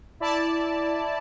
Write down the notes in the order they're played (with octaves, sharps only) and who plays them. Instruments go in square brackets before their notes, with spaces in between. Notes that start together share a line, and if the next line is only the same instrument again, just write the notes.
[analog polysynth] E4 D5 A5